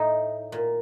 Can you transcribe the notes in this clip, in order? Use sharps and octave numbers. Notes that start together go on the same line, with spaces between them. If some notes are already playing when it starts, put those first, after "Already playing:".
Already playing: A2 D#4
A#2